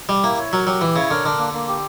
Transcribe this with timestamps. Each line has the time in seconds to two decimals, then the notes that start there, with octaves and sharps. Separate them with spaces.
0.09 G3 G4
0.23 A#3 E4
0.38 C#5
0.53 F#3 A#4
0.67 F#3 G4
0.81 E3 E4
0.96 C#3 C#5
1.11 D3 A#4
1.25 D3 D4
1.39 A#3
1.54 A#3
1.68 G4